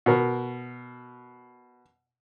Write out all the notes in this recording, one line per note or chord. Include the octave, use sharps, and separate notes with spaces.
B2 A#4